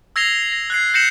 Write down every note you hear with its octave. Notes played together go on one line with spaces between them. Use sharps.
E6 G#6 A#6 C7 F7 G7
A#6
F#6 G#6 C7
G6 A#6 C7 C#7 E7 F#7